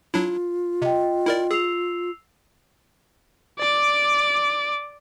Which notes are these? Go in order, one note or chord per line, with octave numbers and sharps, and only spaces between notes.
F#3 D4 E4 F4
C3 D#5 G5
E4 A#4 D5
G#4 E6 C7 F7
D5 D6